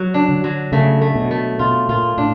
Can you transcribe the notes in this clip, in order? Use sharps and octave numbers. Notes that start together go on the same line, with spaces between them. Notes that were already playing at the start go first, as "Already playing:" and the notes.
Already playing: F#3
D4
D3
F#3
C#3 A3
A3
B2
A3
B2 F4
A#2 F4
A2 D4